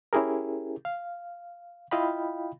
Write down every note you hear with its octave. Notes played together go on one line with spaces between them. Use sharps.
C#4 E4 G4 G#4 A#4
F5
E4 F4 D#5 F5 G5 B5